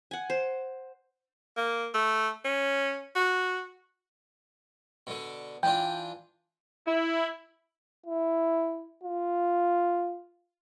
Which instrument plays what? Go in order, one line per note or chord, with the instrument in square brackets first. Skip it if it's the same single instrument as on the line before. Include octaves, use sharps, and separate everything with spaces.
[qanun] F#5 G#5
C5
[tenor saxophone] A#3
A3
C#4
F#4
[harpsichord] B2 D3
[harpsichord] E3 D4 F4 [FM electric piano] G5
[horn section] E4
[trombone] E4
F4